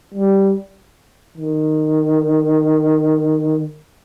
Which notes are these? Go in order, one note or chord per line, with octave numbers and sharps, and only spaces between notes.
G3
D#3